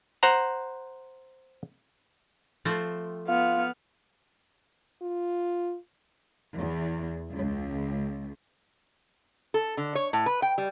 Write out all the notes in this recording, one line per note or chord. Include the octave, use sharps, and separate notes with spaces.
C5 F#5 A#5
F3 A3 C4
B3 F4 F6
F4
E2
C#2
A4
D3
C#5
A2
B4
G5
G3